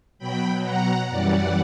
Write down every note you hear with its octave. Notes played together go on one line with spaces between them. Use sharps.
B2 F#3 G5 B5
F#5 A#5
F#2 E3 G3 D5 F#5